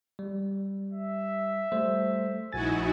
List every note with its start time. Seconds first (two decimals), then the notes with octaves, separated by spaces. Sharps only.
0.19 G3
0.92 E5
1.72 G3 A3 C5
2.53 A#1 D#4 E4 F#4 G#5 A6